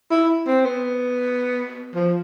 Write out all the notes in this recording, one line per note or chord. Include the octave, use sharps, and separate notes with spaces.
E4
C4
B3
F3